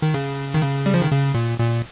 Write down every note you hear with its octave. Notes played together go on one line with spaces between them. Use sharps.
D#3
C#3
D#3
C#3
G3
F3
D#3
C#3
A#2
A#2